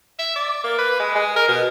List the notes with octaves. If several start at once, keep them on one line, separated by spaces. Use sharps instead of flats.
E5
D5
A#3
B4
G#3
G#3
A#4
B2